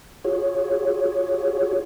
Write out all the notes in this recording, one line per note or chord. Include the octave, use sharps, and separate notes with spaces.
F4 F#4 G#4 C#5